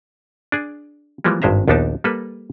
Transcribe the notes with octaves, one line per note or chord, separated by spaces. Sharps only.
D4 G#4
E3 F3 G3 G#3 A#3
G#1 G2 G#3 C5 E5 A#5
A#1 D#2 B3 D4 D#4 A5
G3 A#3 A4 B4